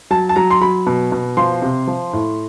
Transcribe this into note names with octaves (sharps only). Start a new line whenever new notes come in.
F#3 A5
A5
F#3 A#5
C6
F#3 B5
B2
B2
F3 C6
C3
F3
A2